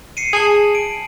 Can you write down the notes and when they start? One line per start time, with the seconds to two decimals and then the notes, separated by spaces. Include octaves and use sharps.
0.17 C7 C#7 D#7
0.33 G#4 G#5 A5 F#7
0.75 D7